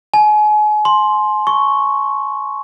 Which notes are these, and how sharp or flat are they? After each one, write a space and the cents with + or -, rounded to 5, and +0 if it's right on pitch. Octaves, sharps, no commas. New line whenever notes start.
G#5 +35
C6 +5
C#6 +0